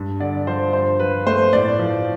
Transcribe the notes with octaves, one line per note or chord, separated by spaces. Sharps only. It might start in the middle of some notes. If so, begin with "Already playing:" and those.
Already playing: G2
D3 D5
F3 C5
G2 C5
F3 B4
A3 C5
A2 D5
F3